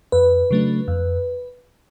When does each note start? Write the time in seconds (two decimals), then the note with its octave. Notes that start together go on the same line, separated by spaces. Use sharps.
0.12 F2 B4
0.51 C#3 F#3 A3 D4
0.88 F2